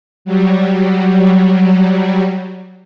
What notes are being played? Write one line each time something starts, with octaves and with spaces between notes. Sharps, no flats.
F#3 G3